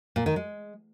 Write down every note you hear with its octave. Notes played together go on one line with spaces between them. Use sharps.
A#2
D#3
G#3